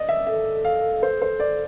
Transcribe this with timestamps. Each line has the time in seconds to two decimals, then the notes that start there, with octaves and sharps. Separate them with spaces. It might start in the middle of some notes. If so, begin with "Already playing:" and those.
Already playing: D5 D#5
0.09 E5
0.27 A4 E5
0.64 F5
1.03 C5
1.22 C5
1.40 D5